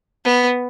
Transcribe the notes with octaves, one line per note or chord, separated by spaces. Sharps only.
B3